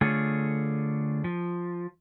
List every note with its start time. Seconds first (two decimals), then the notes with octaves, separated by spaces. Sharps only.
0.01 D3 A3 F4 G#4 C#5
1.24 F3